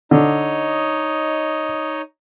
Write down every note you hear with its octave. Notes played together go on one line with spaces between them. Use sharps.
D3 D#4 C#5 D#5